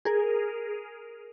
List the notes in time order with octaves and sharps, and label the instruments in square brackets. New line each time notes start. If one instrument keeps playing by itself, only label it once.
[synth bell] G#4 A#4